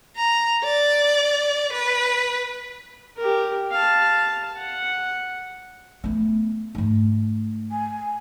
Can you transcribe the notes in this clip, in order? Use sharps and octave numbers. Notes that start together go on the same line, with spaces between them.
A#5
D5
B4
G4 A#4
F5 A5
F#5
A3 B3
G#2 A3
G#5